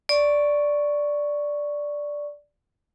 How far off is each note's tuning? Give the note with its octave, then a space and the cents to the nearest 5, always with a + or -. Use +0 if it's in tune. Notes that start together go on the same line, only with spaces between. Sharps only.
D5 -5 C#6 +0